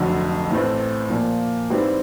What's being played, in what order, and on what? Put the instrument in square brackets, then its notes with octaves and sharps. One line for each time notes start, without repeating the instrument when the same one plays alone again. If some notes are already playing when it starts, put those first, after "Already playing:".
Already playing: [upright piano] F1 F2 D3 F#3
A1 A2 E3 A3 C4
A#2 F3 A#3
G#2 E3 G3 C4 E4